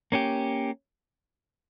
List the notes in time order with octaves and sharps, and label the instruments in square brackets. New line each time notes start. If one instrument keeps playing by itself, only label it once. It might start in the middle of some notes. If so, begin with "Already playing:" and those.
[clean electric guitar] A#3 C#4 G4